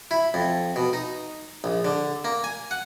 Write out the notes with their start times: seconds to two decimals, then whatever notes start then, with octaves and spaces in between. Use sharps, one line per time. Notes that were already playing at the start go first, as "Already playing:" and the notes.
0.11 E4
0.34 F2
0.76 B2
0.93 D#4
1.64 A#1
1.85 D3
2.25 A#3
2.44 G#5
2.71 F#5